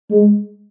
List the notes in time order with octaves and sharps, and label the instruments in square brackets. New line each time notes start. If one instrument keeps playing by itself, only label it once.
[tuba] G#3